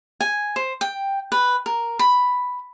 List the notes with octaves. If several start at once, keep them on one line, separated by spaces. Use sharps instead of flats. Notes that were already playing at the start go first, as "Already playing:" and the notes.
G#5
C5
G5
B4
A#4
B5